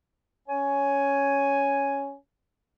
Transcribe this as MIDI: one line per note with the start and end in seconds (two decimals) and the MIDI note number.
0.48 2.14 61
0.48 2.14 73
0.48 2.14 80